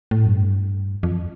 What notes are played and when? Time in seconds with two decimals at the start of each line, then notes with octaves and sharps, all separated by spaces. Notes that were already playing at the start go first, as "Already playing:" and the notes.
0.11 A2
0.26 F#2
0.30 G2
1.03 F2